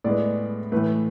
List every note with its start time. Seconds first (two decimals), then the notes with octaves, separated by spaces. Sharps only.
0.04 A2 G#3 B3 D5
0.72 A2 E3 A3 B4